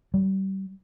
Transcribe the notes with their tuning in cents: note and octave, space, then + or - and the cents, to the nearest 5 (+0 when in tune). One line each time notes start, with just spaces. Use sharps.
G3 -30